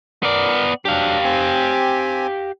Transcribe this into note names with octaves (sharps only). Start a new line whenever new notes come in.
B3 A#4 D5
F#3 D4 G4 F5
C4 G#5